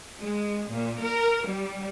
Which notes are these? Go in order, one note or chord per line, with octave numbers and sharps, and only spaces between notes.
G#3
A#2
A#4
G3